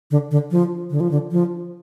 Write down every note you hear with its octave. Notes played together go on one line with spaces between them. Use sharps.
D3
D3
F3
D3
F3
D3
F3